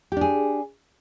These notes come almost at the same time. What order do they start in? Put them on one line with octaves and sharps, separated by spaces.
G4 D4 G#4